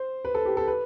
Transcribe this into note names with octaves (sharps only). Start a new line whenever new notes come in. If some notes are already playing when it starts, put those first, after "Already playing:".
Already playing: C5
B4
A4
G4
A4
B4